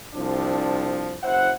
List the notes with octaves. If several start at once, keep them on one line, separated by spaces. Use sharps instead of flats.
C2 C3 F3 D4
F#1 E4 C5 F#5